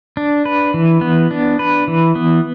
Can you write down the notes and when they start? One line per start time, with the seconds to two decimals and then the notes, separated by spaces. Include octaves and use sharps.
0.17 D4
0.45 B4
0.74 E3
1.01 B3
1.31 D4
1.59 B4
1.88 E3
2.15 B3